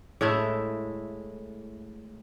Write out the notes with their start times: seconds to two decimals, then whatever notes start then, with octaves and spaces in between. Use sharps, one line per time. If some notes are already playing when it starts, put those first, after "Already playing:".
0.21 A2 G#3 A3 E4